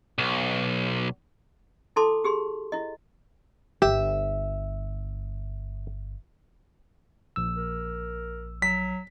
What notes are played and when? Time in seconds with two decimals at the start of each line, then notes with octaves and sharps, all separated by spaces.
0.18 B1
1.96 E4 A4 A5 C6 D6
2.24 G4 G#4 C6
2.72 E4 D#5
3.82 G1 G4 E5
7.36 A#1 E6
7.57 A#4
8.62 F#3 B6